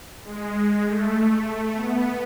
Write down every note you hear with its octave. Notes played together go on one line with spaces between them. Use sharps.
G#3
A3
B3